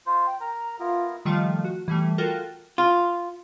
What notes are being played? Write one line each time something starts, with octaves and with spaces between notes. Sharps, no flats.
F4 C5
G5
A#4 A#5
B3 E4 F4 A#4
D#3 F3 G3 A3 F4
F#4
E3 G3 A3
F4 F#4 A4 A#4 G5
F4